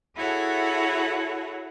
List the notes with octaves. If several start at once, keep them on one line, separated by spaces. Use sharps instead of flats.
E4 F#4 G#4 A4 C#5 F#5